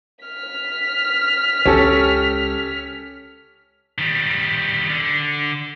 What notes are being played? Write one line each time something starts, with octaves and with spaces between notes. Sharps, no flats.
F6 B6
C#2 C#4 G4 A4
D#3 G3
D3